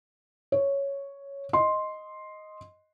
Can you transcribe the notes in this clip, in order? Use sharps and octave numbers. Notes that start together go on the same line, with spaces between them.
C#5
D#5 C6